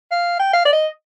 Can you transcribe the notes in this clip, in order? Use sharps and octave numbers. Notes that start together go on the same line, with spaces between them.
F5
G5
F5
D5
D#5